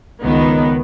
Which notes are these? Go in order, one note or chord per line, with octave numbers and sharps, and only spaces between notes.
C#2 D#3 B3